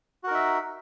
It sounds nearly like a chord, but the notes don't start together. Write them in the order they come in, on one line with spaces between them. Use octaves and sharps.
F#4 A#4 D#4 E5